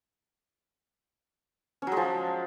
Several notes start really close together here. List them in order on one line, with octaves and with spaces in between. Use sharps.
C#4 F#3 G#3 F3